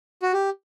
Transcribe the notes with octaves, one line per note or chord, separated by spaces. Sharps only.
F#4
G4